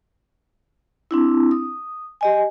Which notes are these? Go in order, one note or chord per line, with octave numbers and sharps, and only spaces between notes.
C4 D4 E4
D#6
G4 D#5 G#5